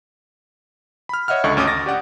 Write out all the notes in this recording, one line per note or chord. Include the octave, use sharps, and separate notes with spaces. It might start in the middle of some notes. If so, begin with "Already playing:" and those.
B5 F6
C#5 D#5 E5 F#5 F6
C#2 D3 D#5 C#6
G#1 D2 C#4 D6 D#6
A6 A#6
G4 D5 F#5